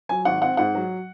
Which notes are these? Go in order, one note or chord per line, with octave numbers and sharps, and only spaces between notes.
F#3 G#5
G#1 F#5
C4 F#5
G#2 F#5
F#3